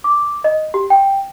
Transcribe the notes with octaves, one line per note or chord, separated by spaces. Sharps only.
D6
D#5
G4
G5